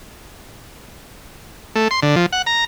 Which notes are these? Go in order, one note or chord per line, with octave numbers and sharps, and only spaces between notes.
A3
C6
D3
F3
F#5
A#5